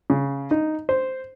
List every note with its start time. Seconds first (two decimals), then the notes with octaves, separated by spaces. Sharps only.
0.10 C#3
0.51 D#4
0.89 C5